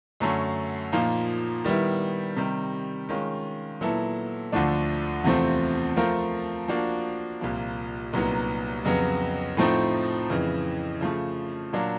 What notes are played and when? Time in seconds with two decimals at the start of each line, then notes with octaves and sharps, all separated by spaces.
0.20 F#2 D3 F#3 A3 C#4
0.92 A#2 F3 A#3 D#4
1.64 D#3 G3 B3 E4
2.37 C3 D#3 G3
3.09 D#3 G#3 C#4 F4
3.81 A#2 F#3 B3 E4 A4
4.52 D2 D3 F3 A3 D4
5.24 E2 C3 F3 A3 C4
5.96 F3 A3 C4 F4 A#4
6.68 F3 A#3 D4 F#4
7.41 C2 A#2 F3 A#3
8.13 C2 A#2 F#3 B3 D#4
8.85 F2 C#3 F#3 B3
9.57 A2 F3 A3 C4 D#4
10.30 F2 C#3 E3
11.01 C#3 F3 A3
11.73 A#2 F#3 A#3 D4